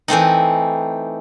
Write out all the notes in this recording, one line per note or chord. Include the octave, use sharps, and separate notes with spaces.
E3 A3 C4 D#4